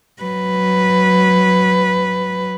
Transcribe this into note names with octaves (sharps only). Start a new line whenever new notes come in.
F#3 B4